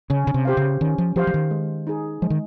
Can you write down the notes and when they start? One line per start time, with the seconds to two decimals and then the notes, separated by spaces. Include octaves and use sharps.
0.10 C#3 C#4
0.27 C#3
0.34 C3
0.45 G4 C5 F5
0.57 C#3
0.81 D#3 C#4
0.98 F3
1.16 F3 G4 C5 F5
1.27 F3
1.34 D#3
1.51 G#3
1.87 D#4 G#4
2.22 F3 G#3
2.30 D#3